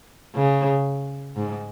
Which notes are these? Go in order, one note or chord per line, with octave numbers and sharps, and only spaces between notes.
C#3
G#2